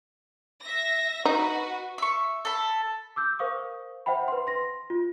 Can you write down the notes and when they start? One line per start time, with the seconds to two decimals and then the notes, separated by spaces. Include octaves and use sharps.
0.62 E5 A#6
1.25 D#4 F#4 B4
1.98 E5 C#6
2.45 A4 B5
3.16 D6 E6 G6
3.39 A#4 C5 F5 C#6 D#6
4.06 C5 E5 F#5 G5 B5
4.28 B4 C6
4.47 C6 A#6
4.90 F4